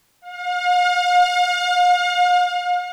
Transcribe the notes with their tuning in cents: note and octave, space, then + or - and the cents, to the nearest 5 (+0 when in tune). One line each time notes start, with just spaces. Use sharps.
F5 +40